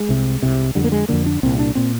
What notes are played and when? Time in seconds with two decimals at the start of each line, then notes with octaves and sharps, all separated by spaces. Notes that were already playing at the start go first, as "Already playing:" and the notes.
Already playing: G#3
0.09 C2 C3
0.42 C2 C3
0.75 F2 D3 G3
0.84 A#3
0.92 G#3
1.09 F2 D3 A#3
1.26 D4
1.43 C2 A#2 C4
1.59 D4
1.75 A#2 C4